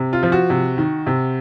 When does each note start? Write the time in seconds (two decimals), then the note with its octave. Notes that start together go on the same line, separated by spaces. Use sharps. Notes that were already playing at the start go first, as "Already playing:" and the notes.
Already playing: C3
0.13 F4
0.23 F3
0.32 F#4
0.50 C3
0.78 D#3
1.07 C3